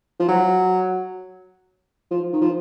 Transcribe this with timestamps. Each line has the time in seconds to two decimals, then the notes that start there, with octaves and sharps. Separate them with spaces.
0.19 F3
0.28 F#3
2.11 F3
2.33 D#3
2.41 F3